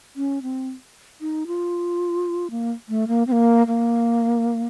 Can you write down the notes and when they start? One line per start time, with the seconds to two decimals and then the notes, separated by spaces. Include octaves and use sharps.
0.16 C#4
0.42 C4
1.21 D#4
1.47 F4
2.51 A#3
2.89 A3
3.08 A#3
3.27 C4
3.32 A#3
3.67 A#3